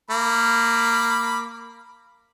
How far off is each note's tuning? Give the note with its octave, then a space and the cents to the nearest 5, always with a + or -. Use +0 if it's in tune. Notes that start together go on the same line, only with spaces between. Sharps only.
A#3 -15 B5 -5 D6 +0